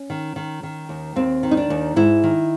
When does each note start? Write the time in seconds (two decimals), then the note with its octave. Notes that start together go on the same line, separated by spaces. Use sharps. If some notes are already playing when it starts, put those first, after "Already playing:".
Already playing: C#4
0.10 D#3
0.36 D#3
0.63 D#3
0.89 D#2
1.16 D#2 C4
1.43 D#3
1.51 D#4
1.57 D4
1.70 D#2
1.96 G#2 E4
2.24 D#3